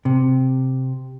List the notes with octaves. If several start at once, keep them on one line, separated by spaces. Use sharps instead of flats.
C3